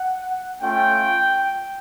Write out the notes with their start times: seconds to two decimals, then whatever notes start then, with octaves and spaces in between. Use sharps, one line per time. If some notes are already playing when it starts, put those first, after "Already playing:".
Already playing: F#5
0.62 A3 C#4 F4 G5